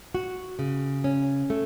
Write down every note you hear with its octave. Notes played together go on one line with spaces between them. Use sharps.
F#4
C#3
C#4
A3